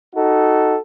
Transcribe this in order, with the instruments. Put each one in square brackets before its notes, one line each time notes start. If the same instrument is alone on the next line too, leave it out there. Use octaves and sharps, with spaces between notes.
[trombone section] D#4 F#4 A4